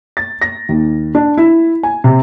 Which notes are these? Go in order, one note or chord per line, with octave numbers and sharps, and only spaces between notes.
A6
A#6
D#2
D4
E4
G#5
C3